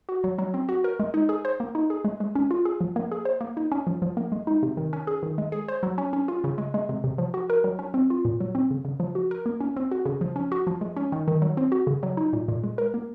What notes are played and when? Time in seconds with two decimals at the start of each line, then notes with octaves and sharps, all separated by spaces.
0.09 F#4
0.24 F#3
0.38 F#3
0.54 C4
0.69 F#4
0.84 A#4
1.00 G#3
1.14 D#4
1.29 G#4
1.45 C5
1.60 A#3
1.75 D#4
1.90 G#4
2.05 G#3
2.20 G#3
2.35 C#4
2.51 F4
2.65 G#4
2.81 F3
2.96 A#3
3.12 G#4
3.25 C5
3.41 A#3
3.57 D#4
3.72 C#4
3.87 F3
4.02 F3
4.17 A#3
4.32 G#3
4.47 D#4
4.63 C3
4.77 D#3
4.93 C#4
5.07 G#4
5.23 D#3
5.38 G#3
5.52 G#4
5.68 C5
5.83 F#3
5.98 C#4
6.13 C#4
6.28 F4
6.44 C#3
6.58 G#3
6.74 G#3
6.89 C3
7.04 C3
7.18 F3
7.34 F#4
7.50 A#4
7.64 F#3
7.79 C#4
7.94 C4
8.10 F4
8.25 A#2
8.40 F#3
8.55 C4
8.71 C#3
8.85 C#3
9.00 F3
9.15 F#4
9.31 A#4
9.46 A#3
9.61 C#4
9.77 C4
9.91 F#4
10.06 C#3
10.21 F3
10.36 C#4
10.52 F#4
10.67 F3
10.81 G#3
10.97 C#4
11.12 D#3
11.28 D#3
11.42 F#3
11.57 C4
11.72 F#4
11.87 C#3
12.03 F#3
12.17 D#4
12.33 A#2
12.48 A#2
12.64 G#3
12.78 A#4
12.94 A#3